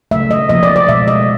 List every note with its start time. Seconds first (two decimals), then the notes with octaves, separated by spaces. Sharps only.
0.11 C#3 F#3 A3 E5
0.31 D#5
0.49 C3 F3 A#3 D#5
0.63 D5
0.76 D5
0.88 B2 G#3 E5
1.08 D#5